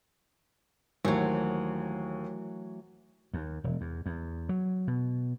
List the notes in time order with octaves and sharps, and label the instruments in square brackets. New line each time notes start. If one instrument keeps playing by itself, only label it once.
[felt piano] D#2 [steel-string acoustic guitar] E3 F#3 [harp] A3 C5 C#6
[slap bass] D#2
E1
E2
E2
F#3
B2